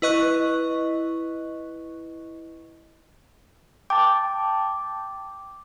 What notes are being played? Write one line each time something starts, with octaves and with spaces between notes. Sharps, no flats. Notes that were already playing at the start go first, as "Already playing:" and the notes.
E4 B4 D#5 C#6 F#6
G5 A5 D6